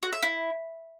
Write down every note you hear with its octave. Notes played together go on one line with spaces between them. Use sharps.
F#4
E5
E4